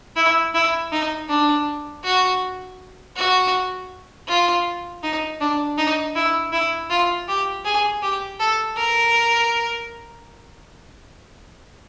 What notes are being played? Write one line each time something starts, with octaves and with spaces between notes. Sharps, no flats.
E4
E4
D#4
D4
F#4
F#4
F4
D#4
D4
D#4
E4
E4
F4
G4
G#4
G4
A4
A#4